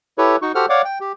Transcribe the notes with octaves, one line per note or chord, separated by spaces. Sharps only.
E4 G4 A4 B4 C#5
D#4 F#4 C#6
F#4 G4 A4 C5 F#5 F6
C#5 D5 F5 F#5 D6
G5
G4